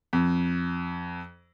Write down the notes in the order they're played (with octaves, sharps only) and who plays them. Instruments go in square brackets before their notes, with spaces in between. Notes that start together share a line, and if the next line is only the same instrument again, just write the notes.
[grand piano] F2